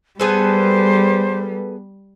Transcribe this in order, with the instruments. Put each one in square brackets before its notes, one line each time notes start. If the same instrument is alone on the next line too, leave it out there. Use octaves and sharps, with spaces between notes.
[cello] G3 [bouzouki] B3 G#4 A4 [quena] C5